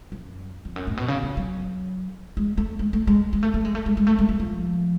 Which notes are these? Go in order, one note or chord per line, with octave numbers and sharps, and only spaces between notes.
F#2
F2
F#2
A2
B2
C#3
F3
F#3
G#3
A3
G#3
A3
G#3
G#3
A3
A3
G#3
A3
G#3
G#3
A3
G#3
G#3
F3